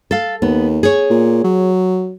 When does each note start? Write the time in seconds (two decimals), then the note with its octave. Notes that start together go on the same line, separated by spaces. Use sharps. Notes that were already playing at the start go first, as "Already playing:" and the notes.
0.11 A4 F5
0.42 D#2 B3
0.83 G#4 C#5
1.10 A#2
1.44 F#3